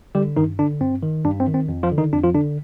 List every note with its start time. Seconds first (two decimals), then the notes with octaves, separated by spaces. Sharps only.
0.15 D3 G3 G4
0.36 G2 D#3 D#4
0.59 D3 D4
0.81 G2 C4
1.03 D#3
1.25 G2 D4
1.40 C4
1.47 D#3
1.54 C4
1.69 F2
1.83 F3 F4
1.91 D3
1.98 D#3 D#4
2.13 F2 D4
2.24 F3 F4
2.35 D3 D4